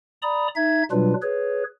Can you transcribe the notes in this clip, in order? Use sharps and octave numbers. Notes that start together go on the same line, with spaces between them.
D5 A#5 B5 D#6
D#4 E5 G#6
B2 F#3 G3 D4 F4 B4
G#4 B4 C#5